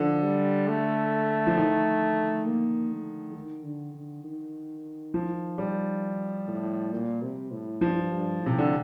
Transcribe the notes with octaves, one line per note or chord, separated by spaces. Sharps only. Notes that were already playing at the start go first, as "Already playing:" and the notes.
Already playing: D3 F3
G3
A3
F3
D#3
A#3
A3
D#3
D3
D3
D#3
F3
G3
A2
A#2
C3
A2
G2 F3
G2
A2
C3
D3